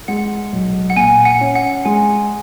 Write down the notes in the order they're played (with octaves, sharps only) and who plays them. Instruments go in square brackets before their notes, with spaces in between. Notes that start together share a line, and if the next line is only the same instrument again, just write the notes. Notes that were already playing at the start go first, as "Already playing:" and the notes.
[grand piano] G#3 [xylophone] F#5
[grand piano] B1
[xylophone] F#5
[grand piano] A#2 [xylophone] G#5
[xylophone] F#5
[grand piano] C#4
[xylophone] F#5
[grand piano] G#3 [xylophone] G#5